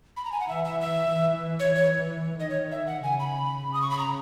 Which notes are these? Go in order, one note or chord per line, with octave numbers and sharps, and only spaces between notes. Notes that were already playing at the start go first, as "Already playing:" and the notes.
B5
A#5
G#5
F#5
E3 E5
E5
E5
E3
C#5
E3 C#5
D#3 D#5
C#5
E5
F#5
C#3 G#5
B5
C#3
D#6
C#6
B5
A#5